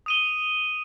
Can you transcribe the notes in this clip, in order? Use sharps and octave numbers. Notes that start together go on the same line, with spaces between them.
D#6 D#7 G7